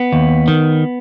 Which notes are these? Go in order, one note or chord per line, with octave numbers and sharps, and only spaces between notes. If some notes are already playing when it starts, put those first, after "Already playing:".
Already playing: B3
D#2
D#3